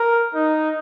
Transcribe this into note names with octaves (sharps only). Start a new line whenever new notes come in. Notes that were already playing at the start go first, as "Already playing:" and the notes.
Already playing: A#4
D#4